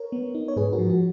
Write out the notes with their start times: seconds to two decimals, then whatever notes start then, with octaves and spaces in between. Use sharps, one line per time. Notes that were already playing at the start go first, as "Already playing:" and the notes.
Already playing: A#4 C#5
0.12 B3
0.35 D#4
0.48 C#5
0.56 G#2 G#4 B4
0.73 F#4 A#4
0.79 F3
0.89 F#4